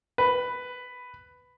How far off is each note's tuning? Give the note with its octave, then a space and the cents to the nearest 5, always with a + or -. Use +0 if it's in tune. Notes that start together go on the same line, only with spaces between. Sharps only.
B4 +10